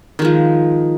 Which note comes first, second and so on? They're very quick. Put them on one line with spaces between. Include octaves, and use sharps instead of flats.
D#3 G#3 F3